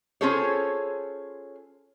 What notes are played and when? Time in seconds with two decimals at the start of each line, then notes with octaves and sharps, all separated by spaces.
0.21 C#4 F4 G#4 A4 C5 C#5